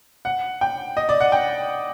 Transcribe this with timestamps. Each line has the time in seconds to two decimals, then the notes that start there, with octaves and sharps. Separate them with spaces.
0.25 F#5
0.61 G5
0.97 D#5
1.09 D5
1.20 F#5
1.32 G5